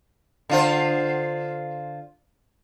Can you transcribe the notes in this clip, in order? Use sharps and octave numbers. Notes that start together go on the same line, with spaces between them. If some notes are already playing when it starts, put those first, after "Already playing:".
D3 F4 C5